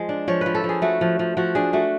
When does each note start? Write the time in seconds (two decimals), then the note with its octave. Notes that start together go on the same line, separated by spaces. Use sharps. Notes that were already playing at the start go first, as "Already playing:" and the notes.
Already playing: F3 G#3
0.09 D4
0.28 F3 C#5
0.41 F3 B4
0.55 A4
0.64 F3
0.69 G#4
0.82 A3 F#4
1.01 F3
1.19 F3
1.37 F3 F#4
1.55 D4 G#4
1.73 A3 F#4